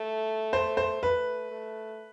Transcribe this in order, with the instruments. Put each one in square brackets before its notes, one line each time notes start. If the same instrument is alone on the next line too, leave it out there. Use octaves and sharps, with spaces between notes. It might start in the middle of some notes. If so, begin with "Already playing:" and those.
Already playing: [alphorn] A3
[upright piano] C5
C5
[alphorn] A3 [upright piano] B4
[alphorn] A3